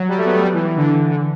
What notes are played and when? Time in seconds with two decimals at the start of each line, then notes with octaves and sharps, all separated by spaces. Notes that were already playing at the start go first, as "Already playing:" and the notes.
Already playing: F#3
0.08 G3
0.17 A3
0.25 B3
0.33 A3
0.42 G3
0.53 E3
0.65 E3
0.77 D3
1.10 D3